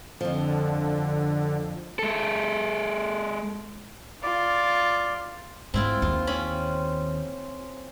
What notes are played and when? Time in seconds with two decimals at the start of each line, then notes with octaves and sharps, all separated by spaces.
0.21 F2 D3 F3
1.99 G#3 A4
4.23 F4 D5
5.74 G#2 C4 E4 F4
6.02 D#2 F4
6.27 C4 C#4 B5